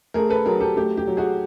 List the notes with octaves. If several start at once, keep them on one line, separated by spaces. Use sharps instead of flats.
A3 G#4 A#4
A4 B4
F#3 G#4 A#4
G4 A4
A3 G4
G4
F#3
F#4 G#4